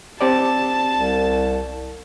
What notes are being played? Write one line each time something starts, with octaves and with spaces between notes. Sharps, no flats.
C4 G4 D5 A5
C2